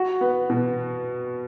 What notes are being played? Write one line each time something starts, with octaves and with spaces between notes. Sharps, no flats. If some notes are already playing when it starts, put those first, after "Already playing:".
Already playing: F#4
B3
B2